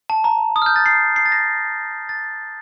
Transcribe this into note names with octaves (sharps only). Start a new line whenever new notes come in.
A5
A#5
D#6
F6
G6
A6
C7
C7
A6
A#6
A6